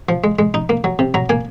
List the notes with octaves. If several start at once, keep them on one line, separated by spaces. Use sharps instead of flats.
F3
G#3
G#3
D#4
A#3
F#3
C3
F#3 A#5
A#3 G#5